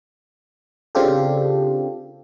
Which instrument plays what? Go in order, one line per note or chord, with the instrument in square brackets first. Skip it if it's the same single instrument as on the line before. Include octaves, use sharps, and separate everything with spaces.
[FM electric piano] C#3 C4 D4 F4 G4 A4